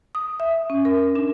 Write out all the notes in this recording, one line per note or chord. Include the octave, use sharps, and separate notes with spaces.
D#6
E5
C#4
A#4
D4